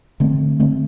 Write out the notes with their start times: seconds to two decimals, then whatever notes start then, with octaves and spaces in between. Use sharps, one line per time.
0.20 D3 A3 C4
0.60 D3 A3 C4